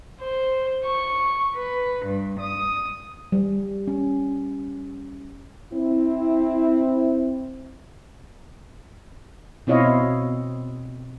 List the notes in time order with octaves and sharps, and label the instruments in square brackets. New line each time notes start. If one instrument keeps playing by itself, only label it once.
[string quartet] C5
C#6
B4
G2
D#6
[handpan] G3
C#4
[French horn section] C4 E4
[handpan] B2 C4 E4 C#5 D#5 F5